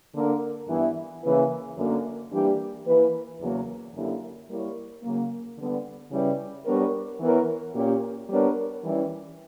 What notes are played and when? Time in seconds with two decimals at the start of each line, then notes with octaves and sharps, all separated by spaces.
0.14 D3 A#3 D4 A#4
0.67 G2 E3 B3 E4
1.22 C#3 E3 A#3 E4 B4
1.76 F#2 D3 F#3 A#3
2.31 E3 G3 A#3 D4 G4
2.86 E3 A#3 E4 B4
3.40 E2 C#3 F#3 A#3
3.94 F#2 D3 A#3 E4 G4
4.49 G3 A#3 E4 A#4 C#5
5.02 C#3 F#3 A#3
5.57 D3 G3 B3
6.11 C#3 G3 C#4 E4 B4
6.65 G3 B3 D4 A#4 C#5
7.20 E3 B3 E4 A#4 C#5
7.74 A#2 A#3 C#4 G4
8.28 G3 B3 D4 A#4 C#5
8.83 E3 G3 C#4 E4